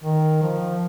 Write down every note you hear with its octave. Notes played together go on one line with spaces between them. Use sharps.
D#3
F3